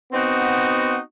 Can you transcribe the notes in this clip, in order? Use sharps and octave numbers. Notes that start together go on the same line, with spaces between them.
B3 C4 D#4 F#4